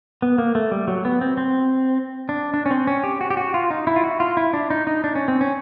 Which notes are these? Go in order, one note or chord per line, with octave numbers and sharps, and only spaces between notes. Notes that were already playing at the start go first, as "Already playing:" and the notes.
B3
A#3
A3
G3
F#3
B3
C4
C4
D4
D4
C#4
C4
C#4
G4
F#4
G4
F#4
F4
D#4
E4
F4
F#4
F4
E4
D4
D#4
D#4
D4
C#4
C4
C#4